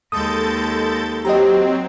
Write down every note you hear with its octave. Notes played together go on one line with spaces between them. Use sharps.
D#2 G#3 A4 D#6 G6 A6
F#3 C4 G4 D#5 A#5